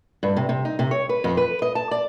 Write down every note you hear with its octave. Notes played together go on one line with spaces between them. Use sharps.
G2
C3
C3
D#4
C3
C#5
B4
F2
B4
D#5
A5
D5